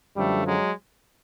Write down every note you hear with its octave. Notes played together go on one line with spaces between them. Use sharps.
F#2 D3 F3 G3 A3
F#3 G#3